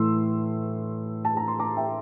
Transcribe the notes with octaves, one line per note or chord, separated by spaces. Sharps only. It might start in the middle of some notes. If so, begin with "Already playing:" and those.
Already playing: A2 E3 A3 C6 E6
A5
A#5
C6
A#5 D6
E5 G5